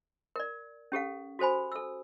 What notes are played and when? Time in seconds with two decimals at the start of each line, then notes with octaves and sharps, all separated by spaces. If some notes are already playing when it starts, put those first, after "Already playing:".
0.36 A#4 D5
0.92 C#4 G4 A4 F5
1.39 F#4 A4 C5 G#5 B5
1.72 A4 E6